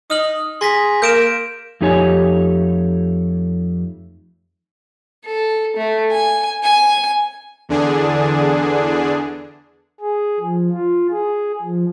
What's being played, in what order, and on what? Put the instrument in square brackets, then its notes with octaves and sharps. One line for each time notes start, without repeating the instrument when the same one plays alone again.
[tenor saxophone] D#4 [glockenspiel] D#6 F6 F#7
[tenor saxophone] G#4 [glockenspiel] C6 A#6 B6
[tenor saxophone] A#3 [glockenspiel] G6 D7 E7
[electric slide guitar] F2 A3 D#4 G4 C#5 G#5
[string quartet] A4
A3
G#5
G#5
[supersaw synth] E2 D3 D4 G#4
[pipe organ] G#4
F3
F4
G#4
F3